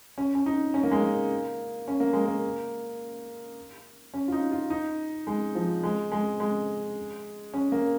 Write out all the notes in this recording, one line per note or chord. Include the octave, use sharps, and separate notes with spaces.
C#4
C#4
D#4
C#4
A#3
G#3
A#3
C#4
A#3
G#3
A#3
C#4
F4
D#4
F4
D#4
G#3
F3
G#3
G#3
G#3
C#4
A#3